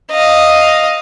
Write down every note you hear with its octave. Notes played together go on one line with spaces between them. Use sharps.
D#5 F5